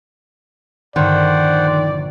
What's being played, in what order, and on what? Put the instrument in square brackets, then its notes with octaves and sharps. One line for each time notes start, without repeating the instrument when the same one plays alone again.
[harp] A#1 G2 D3 [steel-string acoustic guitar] D#3 [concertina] C5 F#5 [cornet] D5